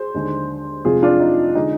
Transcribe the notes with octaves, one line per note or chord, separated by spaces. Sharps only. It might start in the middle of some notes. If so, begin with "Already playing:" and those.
Already playing: G#4 C5
D#2 D3 G#3
F1 F2 C3 F3 G#3 F4 G#4
D4 F4
D#4
D3 G#3 D#4